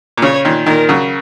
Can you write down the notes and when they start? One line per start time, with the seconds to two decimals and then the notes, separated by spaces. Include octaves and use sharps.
0.17 A#2
0.22 C#3 C#5
0.45 A#2 D#3
0.66 A#2 D#3 A#4
0.89 C#3 F#3